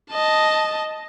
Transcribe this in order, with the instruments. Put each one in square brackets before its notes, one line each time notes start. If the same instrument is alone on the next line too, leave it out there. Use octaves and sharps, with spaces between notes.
[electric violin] D#5 A5